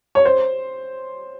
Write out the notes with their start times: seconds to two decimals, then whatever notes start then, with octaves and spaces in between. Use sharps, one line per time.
0.15 C#5
0.25 C5